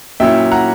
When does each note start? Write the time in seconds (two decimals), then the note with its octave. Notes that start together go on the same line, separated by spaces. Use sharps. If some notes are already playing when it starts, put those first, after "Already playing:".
0.20 A#2 F#3 C#4 E4 E5 G5
0.52 F#5 A#5